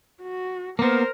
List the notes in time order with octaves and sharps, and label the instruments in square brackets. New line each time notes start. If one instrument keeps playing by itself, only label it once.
[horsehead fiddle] F#4
[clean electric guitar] A#3 B3 [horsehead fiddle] A#4 C5